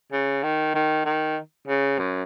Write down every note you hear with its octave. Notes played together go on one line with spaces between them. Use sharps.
C#3
D#3
D#3
D#3
C#3
F#2